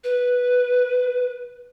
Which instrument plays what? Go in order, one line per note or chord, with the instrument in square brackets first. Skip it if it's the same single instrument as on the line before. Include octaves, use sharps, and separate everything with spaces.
[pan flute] B4